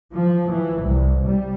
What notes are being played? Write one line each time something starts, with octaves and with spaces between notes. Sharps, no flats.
F3
E3
C2
G3